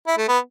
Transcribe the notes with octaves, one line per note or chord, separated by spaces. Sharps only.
E4
A3
B3